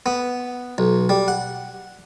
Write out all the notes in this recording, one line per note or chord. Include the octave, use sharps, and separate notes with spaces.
B3
B1
G3
F#5